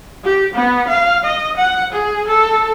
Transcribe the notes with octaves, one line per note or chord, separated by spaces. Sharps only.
G4
B3
F5
D#5
F#5
G#4
A4